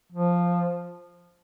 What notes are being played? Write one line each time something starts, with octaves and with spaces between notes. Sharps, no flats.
F3